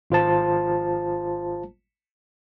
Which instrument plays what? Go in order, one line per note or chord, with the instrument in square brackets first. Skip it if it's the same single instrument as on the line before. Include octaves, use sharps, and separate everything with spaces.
[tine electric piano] G#1 F4 C5 A5